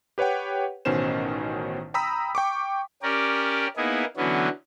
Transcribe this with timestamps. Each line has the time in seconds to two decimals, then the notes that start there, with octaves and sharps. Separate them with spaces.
0.18 G4 B4 C#5 F#5 G5
0.85 A1 B2 D#3 C#4 C5 E7
1.94 G5 A#5 B5 D#6 E6 B6
2.35 G5 C#6 D6
3.03 C#4 G4 A#4 D5
3.77 A#3 B3 D#4 E4 G#4
4.17 D3 E3 F#3 B3 C#4